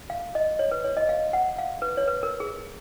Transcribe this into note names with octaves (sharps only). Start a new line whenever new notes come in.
F5
D#5
C#5
B4
C#5
D#5
F5
F#5
F5
B4
C#5
B4
A#4
G#4